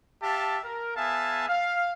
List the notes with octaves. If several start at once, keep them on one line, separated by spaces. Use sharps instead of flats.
G4 E5 F5 A5
A#4
B3 G#4 E5 F5 G#5 A5
F5